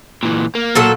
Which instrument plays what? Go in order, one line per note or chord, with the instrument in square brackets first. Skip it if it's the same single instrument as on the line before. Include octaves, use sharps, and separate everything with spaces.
[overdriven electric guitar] A#2 E3
A#3
[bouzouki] A#2 F#3 A4